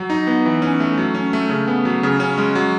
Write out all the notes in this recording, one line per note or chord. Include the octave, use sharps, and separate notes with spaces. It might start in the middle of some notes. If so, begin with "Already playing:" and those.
Already playing: F#3
D#4
B3
E3
C#4
A3
F#3
C#4
A3
C#3
B3
F#3
C#3
C#4
G#3
F#3